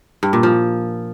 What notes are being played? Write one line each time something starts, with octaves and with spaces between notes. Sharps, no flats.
G2
A#2
F3